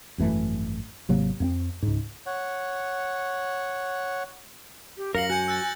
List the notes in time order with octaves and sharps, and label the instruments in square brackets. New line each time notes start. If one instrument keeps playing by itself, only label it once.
[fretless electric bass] G#1 F#2 E3 A3
G#1 C3 F#3 A#3
F2 A#3 C4
C#2 G#2
[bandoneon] C#5 F#5
[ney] G4
[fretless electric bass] F#2 [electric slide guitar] A#4 [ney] F5 [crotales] A#6 C#7 F#7
[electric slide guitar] F#4 [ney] G#5 [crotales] G6 C#7
[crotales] E6 F#6 A6